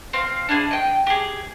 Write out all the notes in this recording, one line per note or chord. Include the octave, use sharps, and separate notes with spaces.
C4 F5
D4 E4 G#4
D#5 G5
G4 G#4